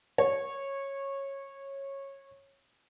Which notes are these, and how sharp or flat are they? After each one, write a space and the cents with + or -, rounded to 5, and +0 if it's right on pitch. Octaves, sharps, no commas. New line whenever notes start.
C#5 -15